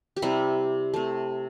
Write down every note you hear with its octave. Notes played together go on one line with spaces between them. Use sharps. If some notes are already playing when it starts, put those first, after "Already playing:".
G4
C3 G3 E4
C3 A3